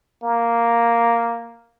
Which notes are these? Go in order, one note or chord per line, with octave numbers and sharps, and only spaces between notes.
A#3